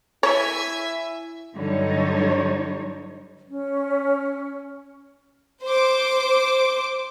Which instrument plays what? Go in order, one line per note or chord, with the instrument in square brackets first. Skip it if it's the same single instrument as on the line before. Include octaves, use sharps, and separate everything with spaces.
[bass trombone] E4 [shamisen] C#5 [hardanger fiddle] E5 G#5
[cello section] G2 D3 F#3 G3 D#4 C#5
[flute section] C#4
[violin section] C5 D6